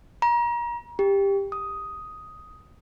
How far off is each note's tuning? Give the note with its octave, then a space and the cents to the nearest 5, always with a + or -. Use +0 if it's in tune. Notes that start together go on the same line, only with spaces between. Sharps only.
A#5 +35
G4 +15
D#6 +5